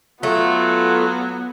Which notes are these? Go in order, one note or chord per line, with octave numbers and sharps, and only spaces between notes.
F#3 A3 B3 F4